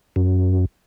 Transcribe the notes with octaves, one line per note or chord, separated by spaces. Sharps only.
F#2